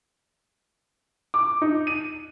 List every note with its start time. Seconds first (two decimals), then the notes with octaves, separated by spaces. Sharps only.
1.34 D6
1.62 D#4
1.87 D#7